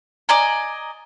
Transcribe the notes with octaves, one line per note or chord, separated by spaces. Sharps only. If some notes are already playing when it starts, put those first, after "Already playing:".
D5 D#5 G#5 A#5